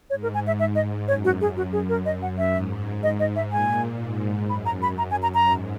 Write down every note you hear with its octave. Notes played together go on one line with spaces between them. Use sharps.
G#2 C#5
A#4
G#5
E5
E5
D#5
F#2 C#5
F#4
G#4
F#4
G#4
A#4
D#5
F#5
E5
G#2
G#2 D#5
D#5
E5
A#2 G#5
G#2
F#2 B5
A#5
B5
A#5
G#5
A#5
A#5
G#2